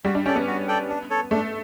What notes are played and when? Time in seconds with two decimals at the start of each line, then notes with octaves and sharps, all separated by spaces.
0.04 G3 F#4
0.15 D4
0.25 C#4 A4 D5 G5
0.36 B3
0.47 F#4
0.68 A4 D5 G5
0.89 D4
1.10 A4 C#5
1.31 A3 D4